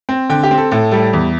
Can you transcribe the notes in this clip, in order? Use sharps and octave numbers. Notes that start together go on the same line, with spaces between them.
C4
D3 G5
G4
C4
A4
A2 A4
G3 A4
E2